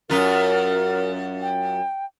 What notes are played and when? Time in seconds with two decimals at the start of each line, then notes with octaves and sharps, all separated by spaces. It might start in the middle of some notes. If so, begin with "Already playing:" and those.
0.10 F#2 F4 A#4
1.42 G5